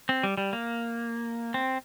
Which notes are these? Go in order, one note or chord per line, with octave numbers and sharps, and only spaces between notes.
C4
G3
G3
A#3
C4